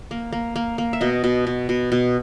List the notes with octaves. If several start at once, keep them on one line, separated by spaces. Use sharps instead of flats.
A#3
A#3
A#3
A#3
E5
B2 D#5
B2
B2
B2
B2